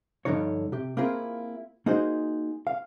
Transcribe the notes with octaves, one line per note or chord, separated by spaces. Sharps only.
G2 D3 F3 D#4 C#5
C3 G4
A#3 C4 E4 F4 G#4 A#4
A#3 D#4 F#4 G#4 C5
F5